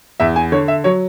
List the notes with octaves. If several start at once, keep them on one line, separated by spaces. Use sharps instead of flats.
E2 E5
G#5
D3 C#5
E5
F#3 C#5